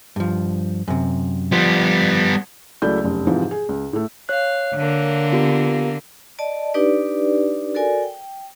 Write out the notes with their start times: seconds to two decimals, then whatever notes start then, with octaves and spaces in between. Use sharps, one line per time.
0.16 G2 F3
0.88 F#2 C3
1.52 F3 G3 B3
2.82 C#2 F#3 A3 E4 D5 G6
3.04 F1 F#2
3.27 G#2 C3 E3 F3
3.51 G#4
3.69 C#2
3.93 A2 A3
4.29 C#5 F5 F#6
4.75 D3 A#3
5.32 B3 F4 G4
6.39 D5 D#5 A5
6.74 D4 D#4 G4 B4 D5
7.74 F#4 A4 A#4 D5 G#5
8.03 G5